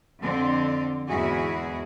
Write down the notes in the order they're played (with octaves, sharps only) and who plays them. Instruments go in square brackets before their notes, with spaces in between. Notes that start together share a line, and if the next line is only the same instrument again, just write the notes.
[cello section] F2 D3 C4
E2 G#2 E4 F#4 G#4